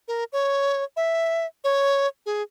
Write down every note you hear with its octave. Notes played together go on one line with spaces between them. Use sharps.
A#4
C#5
E5
C#5
G#4